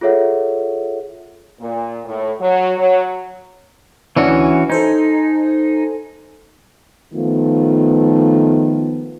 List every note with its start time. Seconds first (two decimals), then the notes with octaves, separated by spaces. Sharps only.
0.01 F4 G#4 A4 C#5 E5 F#5
1.60 A#2
2.05 A2
2.39 F#3
2.77 F#3
4.16 D2 E3 C#4 D4 E4 F#4
4.70 D#4 A4 C5 G#5
7.14 D#3 F3 A3 B3 F4